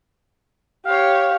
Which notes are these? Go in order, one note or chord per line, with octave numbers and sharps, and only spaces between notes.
G4 C#5 F5